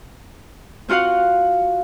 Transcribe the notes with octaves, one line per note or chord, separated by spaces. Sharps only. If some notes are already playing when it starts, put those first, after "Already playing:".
C4 F4 F#4 F5 F#5